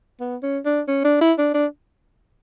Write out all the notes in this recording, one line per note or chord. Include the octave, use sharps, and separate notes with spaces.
B3
C#4
D4
C#4
D4
E4
D4
D4